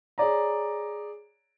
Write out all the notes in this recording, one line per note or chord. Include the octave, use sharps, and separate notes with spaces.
G#4 C#5 D5 A#5